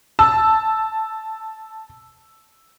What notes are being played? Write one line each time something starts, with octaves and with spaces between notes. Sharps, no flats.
A5 E6